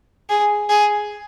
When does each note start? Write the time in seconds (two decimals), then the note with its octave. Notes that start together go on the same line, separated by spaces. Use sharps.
0.30 G#4
0.70 G#4